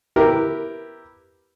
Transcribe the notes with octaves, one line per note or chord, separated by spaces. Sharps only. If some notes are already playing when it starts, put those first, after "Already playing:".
E4 G4 A#4 B4